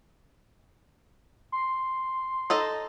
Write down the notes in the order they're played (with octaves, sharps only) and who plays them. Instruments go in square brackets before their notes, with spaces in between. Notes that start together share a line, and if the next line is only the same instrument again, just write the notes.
[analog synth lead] C6
[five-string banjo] D#4 A4 D#5